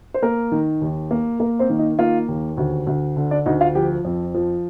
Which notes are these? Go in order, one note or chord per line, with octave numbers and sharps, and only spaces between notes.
C5
A#3 A#4
D#3
D#2
A#3
A#3 A#4
C4 C5
D#3
D#4 D#5
A#3 F4 F5
D#2
D2
D2
D3
D4 D5
D2 D#4 D#5
F4 F5
F3 G4 G5
F2
F3